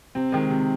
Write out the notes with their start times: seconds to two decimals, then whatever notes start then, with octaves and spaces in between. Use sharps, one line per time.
0.15 C3 C4
0.32 D#3 G#3
0.50 C3